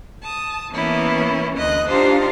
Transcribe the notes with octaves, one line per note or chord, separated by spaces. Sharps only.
A5 D#6
E3 A#3 B3 C#4 E4
D2 D#5 F#6
D4 D#4 F4 G4 C5 F5